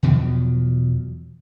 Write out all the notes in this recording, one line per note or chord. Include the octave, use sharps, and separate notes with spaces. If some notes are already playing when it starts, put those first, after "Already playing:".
E2 B2 F3 F#3